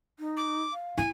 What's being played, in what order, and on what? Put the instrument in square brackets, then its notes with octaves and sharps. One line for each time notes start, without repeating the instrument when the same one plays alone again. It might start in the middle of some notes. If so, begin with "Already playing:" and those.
[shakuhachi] D#4
[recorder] D6
[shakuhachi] F5
[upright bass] E4 [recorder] G#5